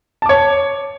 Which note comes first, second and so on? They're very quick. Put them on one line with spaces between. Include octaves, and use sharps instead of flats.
A5 D6 C#5